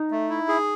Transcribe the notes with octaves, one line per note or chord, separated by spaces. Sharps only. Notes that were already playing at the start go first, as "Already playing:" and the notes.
Already playing: D#4
A3
E4
G#4